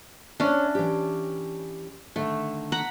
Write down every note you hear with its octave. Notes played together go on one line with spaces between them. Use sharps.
C#4 D4 C#5 E5
E3 G4
D3 D#3 A3
F#5 A#5 B5